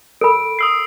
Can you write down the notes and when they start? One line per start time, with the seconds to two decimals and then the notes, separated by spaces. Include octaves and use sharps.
0.21 A4 A#4 B5 D7
0.59 D#6 E6 C7